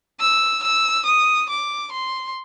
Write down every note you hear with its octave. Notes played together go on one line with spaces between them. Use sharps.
E6
E6
D#6
D6
C6